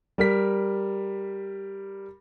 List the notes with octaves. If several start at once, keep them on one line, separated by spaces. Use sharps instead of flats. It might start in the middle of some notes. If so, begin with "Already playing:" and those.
G3 A#4 B6